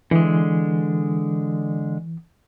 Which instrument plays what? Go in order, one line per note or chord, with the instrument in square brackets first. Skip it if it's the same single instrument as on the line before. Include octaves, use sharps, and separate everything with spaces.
[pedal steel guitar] D3 G#3 [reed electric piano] E3